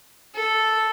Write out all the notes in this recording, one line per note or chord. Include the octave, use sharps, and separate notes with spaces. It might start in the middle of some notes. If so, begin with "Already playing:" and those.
A4